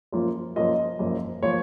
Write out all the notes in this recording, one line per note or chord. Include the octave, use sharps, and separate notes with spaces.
F#2 F3 A#3 F4
F#2 F3 A#3 F4 D#5
F#1 F#2 F3 A#3
F3 A#3 C#5